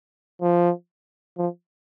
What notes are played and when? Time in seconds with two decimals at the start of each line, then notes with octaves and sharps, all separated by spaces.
0.42 F3
1.38 F3